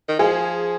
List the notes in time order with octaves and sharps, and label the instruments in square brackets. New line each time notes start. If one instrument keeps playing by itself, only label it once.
[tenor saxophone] D#3
[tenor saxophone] F3 [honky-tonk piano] G#4